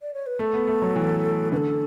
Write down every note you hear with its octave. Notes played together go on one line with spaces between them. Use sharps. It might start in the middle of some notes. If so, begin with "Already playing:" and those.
D5
C#5
B4
A3 A4
B3
A3
F#3
E3
D3 B4
A4